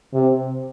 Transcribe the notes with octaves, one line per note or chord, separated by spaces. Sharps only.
C3